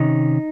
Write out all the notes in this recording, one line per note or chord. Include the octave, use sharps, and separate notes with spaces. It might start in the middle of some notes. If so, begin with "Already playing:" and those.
Already playing: C3 D#3 C#4 D#4